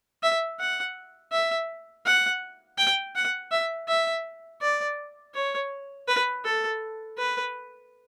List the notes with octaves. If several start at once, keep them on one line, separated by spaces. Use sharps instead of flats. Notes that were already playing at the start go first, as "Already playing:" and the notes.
E5
F#5
E5
F#5
G5
F#5
E5
E5
D5
C#5
B4
A4
B4